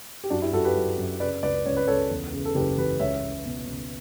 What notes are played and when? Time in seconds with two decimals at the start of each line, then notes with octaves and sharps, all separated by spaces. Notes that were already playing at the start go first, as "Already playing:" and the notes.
0.24 G4
0.30 F#2 D4 F#4
0.42 E4 G4
0.53 F#2 F#4 A4
0.65 G4 B4
0.76 F#3
0.98 F#2
1.20 C#3 B4 D5
1.43 C#2 B4 D5
1.66 C#2 C#5
1.77 B4
1.87 C#2 A4 C#5
2.11 E2
2.33 C#3
2.45 A4
2.55 F#1 G4 B4
2.78 E3 G4 B4
3.00 C#2 C#5 E5
3.23 C#2
3.46 B2
3.67 C#2